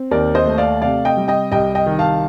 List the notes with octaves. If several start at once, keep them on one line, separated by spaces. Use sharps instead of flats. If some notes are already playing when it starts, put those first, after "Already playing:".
Already playing: C4
D#2 A#4 D5
C5 D#5
A3
D5 F5
C3 D5 F5
D#5 G5
G3
D#5 G5
C2 D#5 G5
D#5 G5
D#3
F5 A5